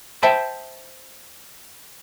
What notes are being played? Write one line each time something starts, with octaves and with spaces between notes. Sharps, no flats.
C5 E5 G5 A5 B5